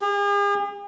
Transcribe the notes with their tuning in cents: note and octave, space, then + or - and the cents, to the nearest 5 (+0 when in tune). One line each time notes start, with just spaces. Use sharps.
G#4 -45